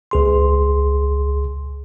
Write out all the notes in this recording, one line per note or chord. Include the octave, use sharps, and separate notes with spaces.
C#2 G#4 C6